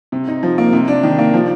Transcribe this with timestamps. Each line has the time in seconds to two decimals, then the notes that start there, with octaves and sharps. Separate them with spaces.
0.12 C3
0.28 D#4
0.43 F3
0.58 A#3
0.73 C3
0.88 D4
1.03 D#3
1.19 A#3
1.34 F3